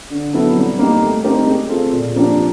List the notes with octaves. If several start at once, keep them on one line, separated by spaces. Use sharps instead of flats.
D3
F#3 B3 E4 A4
G3
A#3 D#4 G4
A3
C4 D#4 G4 A#4
G#3
C4 F4 A4
A#2
F3 A#3 D4 G4